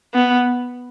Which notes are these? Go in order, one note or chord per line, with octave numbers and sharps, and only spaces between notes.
B3